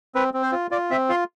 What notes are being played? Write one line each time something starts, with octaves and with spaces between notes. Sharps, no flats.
C4 B4
C4
C5
F4
F4 D5
C4 E5
F4 C6